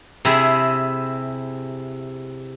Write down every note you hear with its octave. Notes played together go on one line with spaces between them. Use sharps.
C3 E4 G#4